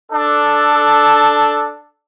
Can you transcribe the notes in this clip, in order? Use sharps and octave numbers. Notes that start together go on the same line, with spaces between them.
D4 A4